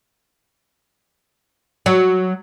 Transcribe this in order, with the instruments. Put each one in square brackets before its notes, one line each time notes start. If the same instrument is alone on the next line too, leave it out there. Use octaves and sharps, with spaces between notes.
[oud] F#3